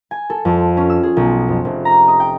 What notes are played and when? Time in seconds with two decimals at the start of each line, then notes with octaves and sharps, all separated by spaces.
0.11 G#5
0.30 A4
0.45 F2
0.77 C#4
0.90 E6
1.03 G#4
1.17 B1
1.48 F2
1.65 F1
1.85 A#5
2.08 D#5
2.20 G5